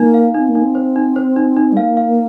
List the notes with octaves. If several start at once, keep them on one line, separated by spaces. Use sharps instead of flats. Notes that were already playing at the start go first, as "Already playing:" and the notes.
Already playing: A#3 D#4
F5
C4 D#4
A#3
D#4
C4
C5
D#4
C5
D#4
D#4
G3
A#3 F5
F5